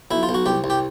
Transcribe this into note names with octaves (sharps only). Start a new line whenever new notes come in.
B1 E4
F4
B1
F#4
C2 G4
C2
G4